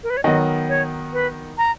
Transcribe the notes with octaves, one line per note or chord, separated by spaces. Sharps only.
A#4
B4
C#5
D#3 F#3 B3 D#5
C#5
B4
A#5